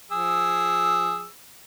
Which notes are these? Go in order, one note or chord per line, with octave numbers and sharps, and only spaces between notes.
F3 G#4 E6